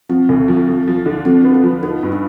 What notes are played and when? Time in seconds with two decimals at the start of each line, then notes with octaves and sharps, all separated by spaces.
0.09 F3 C4
0.29 D2
0.48 F3
0.68 F3
0.88 F3
1.06 D3
1.25 F3 C4
1.44 B3
1.54 F4
1.64 F3
1.83 B3 D#4
2.03 G2
2.12 D4